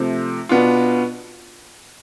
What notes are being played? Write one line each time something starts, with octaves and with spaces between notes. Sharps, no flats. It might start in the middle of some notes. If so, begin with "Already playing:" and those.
Already playing: C3 F3 A3 C4
B2 B3 D4 F4